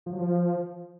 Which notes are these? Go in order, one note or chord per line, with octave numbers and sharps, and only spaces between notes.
F3
F#3
F3